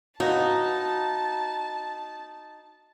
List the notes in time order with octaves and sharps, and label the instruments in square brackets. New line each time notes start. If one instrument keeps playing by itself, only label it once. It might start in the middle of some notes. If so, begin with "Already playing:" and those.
[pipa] A#3 B3 D#5 [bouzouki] D#4 [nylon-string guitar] F#4 [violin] A5